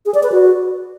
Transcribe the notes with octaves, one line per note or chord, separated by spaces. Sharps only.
G#4
D5
B4
F#4